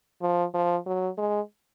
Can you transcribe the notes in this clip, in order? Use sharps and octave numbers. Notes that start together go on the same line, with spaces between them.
F3
F3
F#3
G#3